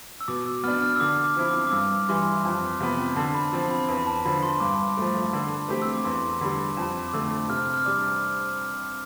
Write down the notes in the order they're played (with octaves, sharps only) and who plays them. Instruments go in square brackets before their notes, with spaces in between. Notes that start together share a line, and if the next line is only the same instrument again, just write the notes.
[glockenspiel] E6
[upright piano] B2 [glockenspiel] D6
[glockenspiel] E6
[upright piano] B3 D4 [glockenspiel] F6
[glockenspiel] F6
E6
[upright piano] D3 [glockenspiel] D6
[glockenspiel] D6
[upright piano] F3 C4 E4
[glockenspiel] D6
D6
[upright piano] G2 [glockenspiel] E6
[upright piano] E3 G3 [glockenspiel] C6
[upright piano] F2 [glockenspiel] A5
[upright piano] C3 F3 B3
[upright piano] D3 [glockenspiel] A5
[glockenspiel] B5
[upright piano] F3 C4 [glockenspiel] A5
[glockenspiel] B5
[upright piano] E2 [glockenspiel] B5
[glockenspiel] B5
A5
[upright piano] D3 F3 [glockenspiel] B5
[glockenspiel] C6
[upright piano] G2 [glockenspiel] D6
[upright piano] F3 A3
D3
A3 C4 G4
[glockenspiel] E6
D6
[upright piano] E2 [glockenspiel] C6
[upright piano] D3 G3 [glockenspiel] B5
[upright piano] F2 [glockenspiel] A5
[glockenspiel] D6
[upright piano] D3 A3 [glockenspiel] E6
[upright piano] C3 [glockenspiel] F6
[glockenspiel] F6
[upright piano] G3 D4 [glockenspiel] D6